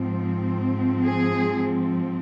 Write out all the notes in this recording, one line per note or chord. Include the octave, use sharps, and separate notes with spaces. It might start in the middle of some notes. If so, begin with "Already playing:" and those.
Already playing: G#2 F3 C4
G#4